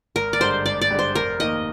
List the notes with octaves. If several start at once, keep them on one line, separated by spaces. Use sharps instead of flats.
G#1 A#4
D5
G2 D3 G#3 C5
G#1 D5
D5
G2 D3 G#3
C5
F1 A#4
D#2 D#3 A#3 D#5